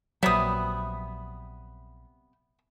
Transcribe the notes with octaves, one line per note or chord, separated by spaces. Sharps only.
A#1 C3 F#3 G3 B3 E5 D#6